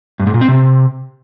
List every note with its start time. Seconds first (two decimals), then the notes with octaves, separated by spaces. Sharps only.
0.20 G2
0.27 G#2
0.34 A#2
0.41 C4
0.48 C3